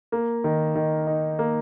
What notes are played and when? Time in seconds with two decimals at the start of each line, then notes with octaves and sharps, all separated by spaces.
0.12 A#3
0.44 D#3
0.75 D#3
1.07 D#4
1.39 A#3